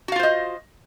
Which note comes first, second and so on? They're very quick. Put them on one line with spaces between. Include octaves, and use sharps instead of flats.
F#4 F5 F4 C5 D#5